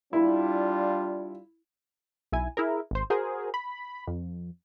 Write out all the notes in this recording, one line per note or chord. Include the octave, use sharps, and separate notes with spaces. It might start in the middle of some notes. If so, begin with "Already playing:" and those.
G3 D4 E4 F4
B1 E4 G#5
E4 G#4 A#4
G#1 C5
F#4 G#4 A#4 C5
B5
F2